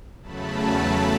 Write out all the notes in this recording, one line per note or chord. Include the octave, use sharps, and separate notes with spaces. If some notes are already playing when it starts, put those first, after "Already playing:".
E2 C#3 F#3 A3 A5 B5